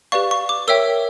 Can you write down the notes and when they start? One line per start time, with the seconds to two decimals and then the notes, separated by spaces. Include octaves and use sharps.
0.12 G4 B4 D5 F5 C#6
0.31 C#6
0.49 D6
0.68 A#4 C#5 E5 G5 E6